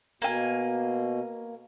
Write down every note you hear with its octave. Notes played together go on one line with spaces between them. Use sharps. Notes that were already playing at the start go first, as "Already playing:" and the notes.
B2 A#3 G#5